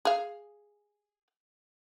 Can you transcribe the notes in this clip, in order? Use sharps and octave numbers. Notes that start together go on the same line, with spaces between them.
G#4 F5